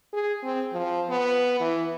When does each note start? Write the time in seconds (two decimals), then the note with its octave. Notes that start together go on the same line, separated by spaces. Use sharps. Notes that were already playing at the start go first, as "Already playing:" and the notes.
0.13 G#4
0.43 C4
0.73 F3
1.09 B3
1.61 E3